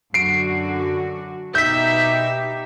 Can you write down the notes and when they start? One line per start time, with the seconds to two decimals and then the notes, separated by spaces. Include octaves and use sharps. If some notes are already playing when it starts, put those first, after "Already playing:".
0.14 F#2 D3 F#4 C7 D7
1.55 B2 D#4 G4 E5 G6 B6